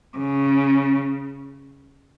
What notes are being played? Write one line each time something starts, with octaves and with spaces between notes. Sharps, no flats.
C#3